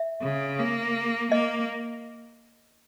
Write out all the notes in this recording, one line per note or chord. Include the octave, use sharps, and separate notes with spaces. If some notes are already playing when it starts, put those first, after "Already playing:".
Already playing: E5
C#3
A#3
A#3 D#5